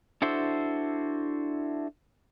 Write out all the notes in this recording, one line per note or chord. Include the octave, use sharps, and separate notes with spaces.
D4 E4 F#4 A4 C5